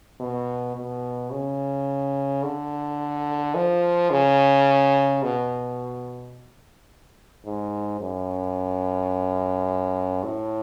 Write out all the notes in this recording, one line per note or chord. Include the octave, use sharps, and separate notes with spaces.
B2
B2
C#3
D3
F3
C#3
B2
G#2
F#2
A2